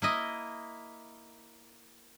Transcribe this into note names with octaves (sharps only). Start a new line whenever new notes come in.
A#3 E4 D#5